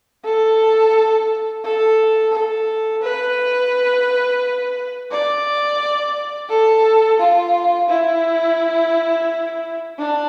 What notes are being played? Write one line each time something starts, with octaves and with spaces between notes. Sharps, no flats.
A4
A4
A4
B4
D5
A4
F4
E4
D4